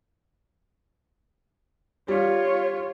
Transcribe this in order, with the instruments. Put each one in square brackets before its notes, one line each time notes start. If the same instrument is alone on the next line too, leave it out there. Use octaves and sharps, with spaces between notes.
[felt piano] G3 [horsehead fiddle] F4 C#5